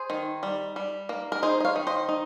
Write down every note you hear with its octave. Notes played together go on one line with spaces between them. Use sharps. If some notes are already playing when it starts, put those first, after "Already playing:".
Already playing: G#4 C5
D#3
G3
G3
A#3
A#4
D#4 G#4 C5
D#5
C#5 F5
D#3
C5 D#5
D#4